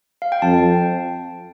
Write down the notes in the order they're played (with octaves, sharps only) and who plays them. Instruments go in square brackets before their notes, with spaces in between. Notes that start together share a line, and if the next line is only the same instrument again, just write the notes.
[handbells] F5
G5
[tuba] F2 [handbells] A5